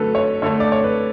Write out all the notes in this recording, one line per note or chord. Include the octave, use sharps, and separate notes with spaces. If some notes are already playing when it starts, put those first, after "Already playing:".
Already playing: D3 F#3 A3 A4 B4
C#5
D3 A3 C#5
D5
C#5
B4